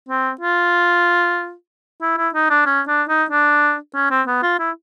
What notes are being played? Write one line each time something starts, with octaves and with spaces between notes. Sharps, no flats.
C4
F4
E4
E4
D#4
D4
C#4
D4
D#4
D4
C#4
C4
B3
F4
E4